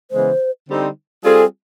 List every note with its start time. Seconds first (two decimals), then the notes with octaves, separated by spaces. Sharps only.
0.10 C#3 E3 G#3 B3 C5
0.67 D3 G3 C4 D#4
1.24 G3 C4 F4 G#4 A4